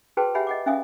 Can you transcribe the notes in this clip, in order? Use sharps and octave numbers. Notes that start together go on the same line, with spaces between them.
F#4 G#4 B4 C5 G5 A5
G4 C#5 E5 F#5 G#5 B5
D#5 F#5 D6
C#4 E5 F5 G#5 D#6